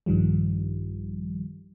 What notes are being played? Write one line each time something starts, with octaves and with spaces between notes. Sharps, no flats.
A#1 G2 D#3 F3 G3